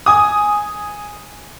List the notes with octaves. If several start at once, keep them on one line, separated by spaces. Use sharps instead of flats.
G#5 D#6